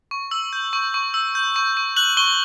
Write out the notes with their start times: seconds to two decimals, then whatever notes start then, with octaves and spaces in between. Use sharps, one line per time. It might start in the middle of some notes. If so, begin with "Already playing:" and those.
0.11 C#6
0.31 E6 F#7
0.53 G6
0.73 C#6
0.94 C#6
1.14 E6
1.35 G6
1.56 C#6
1.77 C#6
1.96 F#6 F#7
2.17 C#6 G7